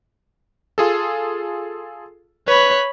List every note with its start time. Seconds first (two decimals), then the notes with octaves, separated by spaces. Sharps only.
0.78 F4 G#4 A4
2.48 B4 C#5 B5